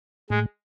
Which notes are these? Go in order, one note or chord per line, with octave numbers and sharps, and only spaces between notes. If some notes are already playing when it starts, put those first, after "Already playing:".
A2 G#3